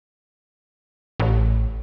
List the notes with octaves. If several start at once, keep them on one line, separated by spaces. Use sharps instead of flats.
A1